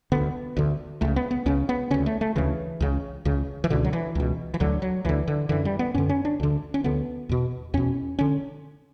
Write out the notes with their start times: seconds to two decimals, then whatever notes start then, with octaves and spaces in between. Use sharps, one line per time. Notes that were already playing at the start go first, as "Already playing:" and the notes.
0.12 D2 D3 B3
0.57 D2 D3
1.01 C#2 C#3 A3
1.16 B3
1.31 B3
1.46 C#2 C#3 C#4
1.69 B3
1.90 D2 C#3 C#4
2.06 A3
2.21 A3
2.36 D2 C#3 E3
2.80 C#2 C#3
3.25 C#2 C#3
3.64 E3
3.70 C#2 B2 D3
3.84 F#3
3.93 E3
4.15 C#2 B2
4.54 E3
4.60 D2 D3 F#3
4.82 F#3
5.05 D2 D3 E3
5.28 D3
5.49 F#2 D3 E3
5.65 G3
5.79 B3
5.94 F#2 D3 C#4
6.09 C#4
6.25 D4
6.40 D2 D3
6.74 C#4
6.84 D2 D3 B3
7.29 E2 B2
7.74 E2 B2 C#4
8.19 D3 C#4